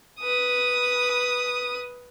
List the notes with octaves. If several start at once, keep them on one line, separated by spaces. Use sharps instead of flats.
B4 D#6